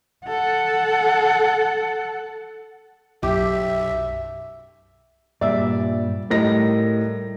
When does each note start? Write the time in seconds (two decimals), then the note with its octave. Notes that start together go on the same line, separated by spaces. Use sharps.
0.26 A4 F#5
3.23 B1 F#2 G4 E5 D6
5.41 G2 A#2 G3 D5 E5
6.30 A2 G3 D#4 A#4 A#6